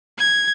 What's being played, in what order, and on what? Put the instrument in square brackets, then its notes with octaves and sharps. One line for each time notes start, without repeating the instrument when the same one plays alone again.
[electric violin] G#6